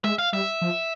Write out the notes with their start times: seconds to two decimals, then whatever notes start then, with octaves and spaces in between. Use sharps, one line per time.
0.04 G#3 E5
0.19 F5
0.33 G3 E5
0.61 F3